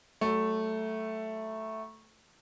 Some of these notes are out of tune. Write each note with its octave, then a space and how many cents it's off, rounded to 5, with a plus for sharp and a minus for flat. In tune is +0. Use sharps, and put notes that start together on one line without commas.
F#3 +40 A3 +0